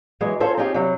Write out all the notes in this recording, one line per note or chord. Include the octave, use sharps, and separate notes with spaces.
E3 F#3 G#3 E4 C#5
C#4 F4 A4 C5 C#5
C4 C#4 D#4 F4 G4 G#4
C3 F#3 G3